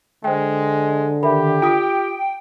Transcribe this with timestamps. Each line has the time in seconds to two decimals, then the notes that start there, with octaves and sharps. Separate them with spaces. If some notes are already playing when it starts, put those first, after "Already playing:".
0.24 D3 G#3 C5 G5
1.23 D#3 G4 E5 B5
1.62 F4 G5 D#6 B6